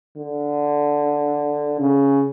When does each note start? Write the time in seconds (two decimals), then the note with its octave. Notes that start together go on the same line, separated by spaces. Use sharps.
0.17 D3
1.79 C#3